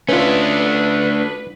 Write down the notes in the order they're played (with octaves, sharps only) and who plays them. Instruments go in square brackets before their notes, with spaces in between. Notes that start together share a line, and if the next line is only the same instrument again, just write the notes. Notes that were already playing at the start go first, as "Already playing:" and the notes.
[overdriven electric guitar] A3 D4 [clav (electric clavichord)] C#4 F4 [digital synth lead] B4